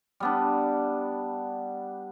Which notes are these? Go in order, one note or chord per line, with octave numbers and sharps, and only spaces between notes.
G3 B3 D4